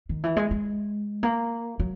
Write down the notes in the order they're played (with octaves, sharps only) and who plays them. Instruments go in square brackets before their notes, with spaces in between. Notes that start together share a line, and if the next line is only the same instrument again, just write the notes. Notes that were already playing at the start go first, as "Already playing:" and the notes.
[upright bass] D#3
E3
G#3
G#3
A#3
F#3